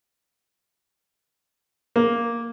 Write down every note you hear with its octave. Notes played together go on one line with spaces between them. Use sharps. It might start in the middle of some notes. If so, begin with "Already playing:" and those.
A#3